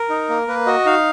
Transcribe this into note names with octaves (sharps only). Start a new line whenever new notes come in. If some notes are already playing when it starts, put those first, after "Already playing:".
Already playing: A#4
D#4
A#3
A#3 B4
F#4 D#5
D#4 F5